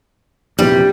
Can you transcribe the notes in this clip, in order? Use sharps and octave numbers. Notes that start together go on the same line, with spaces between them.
A#1 E2 C3 G3